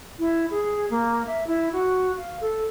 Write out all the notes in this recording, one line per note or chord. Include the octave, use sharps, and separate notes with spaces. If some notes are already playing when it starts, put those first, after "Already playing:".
E4
G#4
A#3
E5
E4
F#4
F5
A4